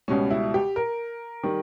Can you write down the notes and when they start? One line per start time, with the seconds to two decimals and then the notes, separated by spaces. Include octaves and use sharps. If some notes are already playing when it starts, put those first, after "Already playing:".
0.08 C#2 B2 G3 C#4
0.31 E4
0.54 G4
0.76 A#4
1.43 D#3 G3